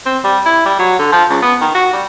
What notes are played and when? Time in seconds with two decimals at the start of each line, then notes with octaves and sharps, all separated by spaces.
0.06 C4
0.24 G3
0.46 E4
0.65 G3
0.79 F#3
0.99 D3
1.12 F3
1.30 C#2
1.42 B3
1.61 D#3
1.74 F#4
1.93 G3